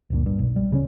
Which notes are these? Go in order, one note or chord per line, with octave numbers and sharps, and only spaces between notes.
D1 G1 D2 A#2
G2
B1
G3
D1 C#3 G#3 C#4